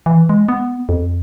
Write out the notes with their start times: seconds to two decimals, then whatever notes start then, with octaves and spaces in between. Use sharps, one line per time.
0.06 E3
0.29 G#3
0.49 B3
0.89 F2